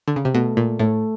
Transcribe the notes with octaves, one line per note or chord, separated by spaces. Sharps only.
D3
C#3
C3
B2 A3
A#2
A2 A3